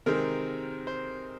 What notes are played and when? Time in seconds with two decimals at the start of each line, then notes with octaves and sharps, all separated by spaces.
0.06 C3 D#3 G#3 C4 A#4
0.87 C5